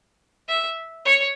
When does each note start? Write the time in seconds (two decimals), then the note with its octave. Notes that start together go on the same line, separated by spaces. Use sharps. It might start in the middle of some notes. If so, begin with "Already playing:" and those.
0.49 E5
1.06 C#5